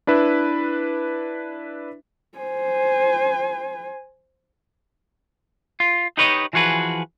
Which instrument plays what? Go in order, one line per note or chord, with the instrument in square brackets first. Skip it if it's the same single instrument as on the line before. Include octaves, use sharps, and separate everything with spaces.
[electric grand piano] D4 E4 B4 E5
[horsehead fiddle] C5 G#5
[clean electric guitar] F4
D#4 G4 B4 C#5 D#5
E3 F3 F#4 G#4 B4